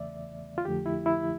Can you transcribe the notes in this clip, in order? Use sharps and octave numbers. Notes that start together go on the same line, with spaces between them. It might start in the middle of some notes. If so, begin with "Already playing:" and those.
Already playing: E2 C#3 E3 A3 D5 E5
F4
F2 D3 F3 A3 G4
E4
E4